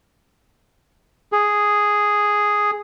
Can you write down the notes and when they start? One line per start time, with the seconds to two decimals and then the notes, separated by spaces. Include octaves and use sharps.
1.32 G#4